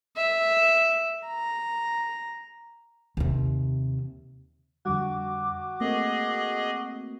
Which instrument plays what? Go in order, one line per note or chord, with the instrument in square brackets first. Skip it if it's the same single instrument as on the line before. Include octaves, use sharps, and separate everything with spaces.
[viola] E5
A#5
[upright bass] D#2 C3
[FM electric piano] F2 D3 G3 [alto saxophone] F#4 [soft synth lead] D6
[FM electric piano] A3 A#3 C4 [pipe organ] G#4 D#5